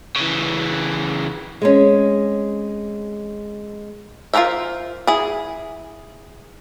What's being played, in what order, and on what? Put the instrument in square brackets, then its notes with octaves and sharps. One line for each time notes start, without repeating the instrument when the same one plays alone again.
[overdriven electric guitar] C#3 E3
[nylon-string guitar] G#3 C4 C#4
[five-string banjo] F4 G#4 A#4 C5 E5
E4 G#4